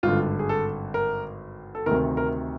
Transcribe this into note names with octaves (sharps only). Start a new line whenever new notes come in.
G#1 G2 D3 F4
G#4
A4
A#4
A4
D2 C3 D#3 A#4
A#4